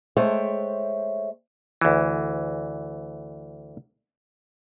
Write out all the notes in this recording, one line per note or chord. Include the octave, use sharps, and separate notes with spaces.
G#3 A3 C5 C#5 E5 G5
D2 E3